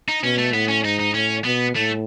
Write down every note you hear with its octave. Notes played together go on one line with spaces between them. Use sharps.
D#4
B2 C#4
A3
A2 B3
C#4
G#2 D#4
D#4
A2 C#4
B2 B3
A2 A3